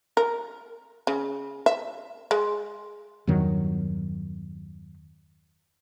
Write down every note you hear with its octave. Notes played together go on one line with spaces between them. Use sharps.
A#4
C#3
E5
G#3
E2 G2 D#3 F#3